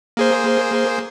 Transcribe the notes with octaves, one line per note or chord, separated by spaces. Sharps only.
A#3 G#4 C5